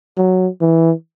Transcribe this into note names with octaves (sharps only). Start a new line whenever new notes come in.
F#3
E3